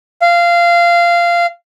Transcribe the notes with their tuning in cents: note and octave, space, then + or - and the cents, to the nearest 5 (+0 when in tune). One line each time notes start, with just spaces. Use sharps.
F5 -15